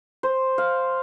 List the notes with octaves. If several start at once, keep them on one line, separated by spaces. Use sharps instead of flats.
C5
F5